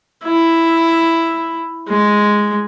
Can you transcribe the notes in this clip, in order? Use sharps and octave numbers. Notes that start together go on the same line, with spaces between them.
E4
G#3